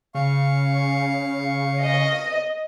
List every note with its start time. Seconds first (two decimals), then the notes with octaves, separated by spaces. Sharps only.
0.15 C#3 F5 C#6
1.83 D#5